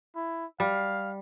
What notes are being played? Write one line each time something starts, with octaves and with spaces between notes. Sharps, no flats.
E4
G3 F5